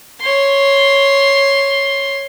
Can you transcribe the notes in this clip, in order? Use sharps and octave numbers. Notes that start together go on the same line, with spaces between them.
C#5 C6